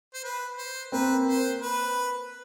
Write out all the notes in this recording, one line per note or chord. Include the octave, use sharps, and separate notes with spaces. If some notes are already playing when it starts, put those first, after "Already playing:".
C5
B4
C5
A#3 C4 B4
C5
B4